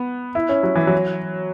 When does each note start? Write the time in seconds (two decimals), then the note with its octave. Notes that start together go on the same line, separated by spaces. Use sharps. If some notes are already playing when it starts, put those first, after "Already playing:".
Already playing: B3
0.35 E4
0.49 C#4
0.63 F#3
0.75 E3
0.87 F#3